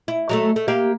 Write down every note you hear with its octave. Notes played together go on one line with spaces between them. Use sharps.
E4
F#3 G#3 A3
A3
A#3 G4 F5